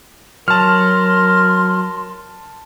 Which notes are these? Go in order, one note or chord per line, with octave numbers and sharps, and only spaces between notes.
F#3 A#4 A5 C6 F6